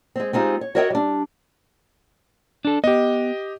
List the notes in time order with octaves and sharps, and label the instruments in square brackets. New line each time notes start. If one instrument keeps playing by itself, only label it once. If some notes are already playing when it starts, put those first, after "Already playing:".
[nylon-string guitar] G#3 C4
G#3 C4 D#4 F4 G4
C#5
F#4 A#4 C#5 D#5 E5 G5
G3 D4
[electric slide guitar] D4 A4
[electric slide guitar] B3 [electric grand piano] G4 D#5